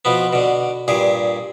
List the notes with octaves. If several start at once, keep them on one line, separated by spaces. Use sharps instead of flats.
B2 F3 B3
B2 D3
G2 A#2 G#4